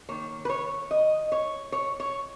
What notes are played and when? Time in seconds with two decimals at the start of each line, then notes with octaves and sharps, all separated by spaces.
0.09 D#3 A#3 C#5
0.45 B4
0.49 C#5
0.91 D#5
1.32 C#5
1.72 C#5
2.00 C#5